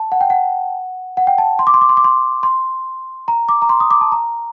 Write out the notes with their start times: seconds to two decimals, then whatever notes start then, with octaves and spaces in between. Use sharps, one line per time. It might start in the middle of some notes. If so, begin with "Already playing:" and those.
Already playing: A5
0.12 F#5
0.21 G5
0.30 F#5
1.17 F#5
1.27 G5
1.38 A5
1.59 C6
1.67 D6
1.74 C6
1.81 D6
1.89 C6
1.97 D6
2.04 C6
2.43 C6
3.28 A#5
3.49 D6
3.62 A#5
3.69 C6
3.80 D#6
3.91 D6
4.01 A5
4.12 A#5